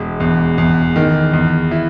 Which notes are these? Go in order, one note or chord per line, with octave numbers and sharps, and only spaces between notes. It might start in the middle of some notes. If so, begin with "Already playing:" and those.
Already playing: E1
E2
E2
D#3
E2
E4